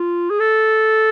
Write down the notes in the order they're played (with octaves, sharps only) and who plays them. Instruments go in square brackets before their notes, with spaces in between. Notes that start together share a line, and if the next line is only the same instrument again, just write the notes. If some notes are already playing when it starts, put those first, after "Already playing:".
Already playing: [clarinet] F4
G#4
A4